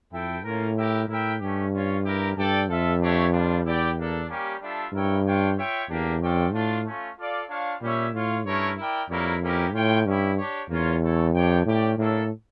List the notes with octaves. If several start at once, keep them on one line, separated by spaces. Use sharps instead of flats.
F2 E4 A4 E5 G5
A2 A#3 C#4 F4 A#4
E4 G4 A#4 E5 G5
A2 E4 A#4 E5 G5
G2 A3 C#4 G4
C#4 F4 C#5
E4 G4 A#4
G2 D4 A4 D5 G5
F2 F4 A4 E5
A3 D4 G4 C#5 E5
G3 D4 F4
E2 E4 G4 D5 G5
A#3 D4 A4
G3 A#3 C#4 G4
G3 D4 F4 A4 E5
G2 E4 A#4 C#5 E5 G5
D4 F4 C#5 G5
F4 C#5 E5 G5
E2 A#3 D4 G4
F2 C#4 F4 A4 D5 G5
A2 A3 D4 F4
A3 C#4 F4
F4 A4 D5 F5
D4 F4 C#5 F5
A#2 G3 C#4 G4 C#5 E5
A2 F4 C#5 F5
G2 A3 C#4 E4 A#4 C#5
E4 A#4 D5 G5
F2 G3 A#3 E4 A#4 C#5
A#3 C#4 E4 G4 A#4
A2 F4 C#5 G5
G2 C#4 E4 G4
D4 G4 C#5
E2 A#3 C#4 F4 C#5
A3 E4 A4 C#5
F2 D4 G4 C#5 G5
A2 C#4 G4 D5 G5
A2 A#3 D4 A4 C#5